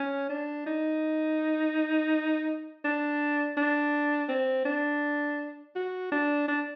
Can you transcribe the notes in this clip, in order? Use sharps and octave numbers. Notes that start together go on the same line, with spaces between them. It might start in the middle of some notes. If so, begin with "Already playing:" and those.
Already playing: C#4
D4
D#4
D4
D4
C4
D4
F#4
D4
D4